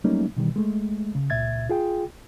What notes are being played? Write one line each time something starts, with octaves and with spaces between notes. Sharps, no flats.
F#3 G3 A3 A#3 C#4 D#4
B2 D#3 E3 G3
G#3 A3
C#3
C#2 A#2 E5 G#6 A6
F4 G#4 G5